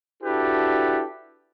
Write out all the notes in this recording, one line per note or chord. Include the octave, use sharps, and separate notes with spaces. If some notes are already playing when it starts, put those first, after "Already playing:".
D4 E4 F#4 G4 A4 B4